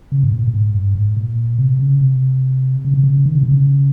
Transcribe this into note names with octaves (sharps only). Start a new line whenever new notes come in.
C#3
G#2
A#2
A#2
G#2
G2
G#2
A#2
C3
C#3
C3
C#3
C3
C#3
D#3
C#3
C3
C#3